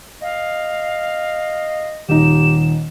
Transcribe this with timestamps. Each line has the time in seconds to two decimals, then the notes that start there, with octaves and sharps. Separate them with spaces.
0.22 D#5 F5
2.09 D#1 D#4 G4 E7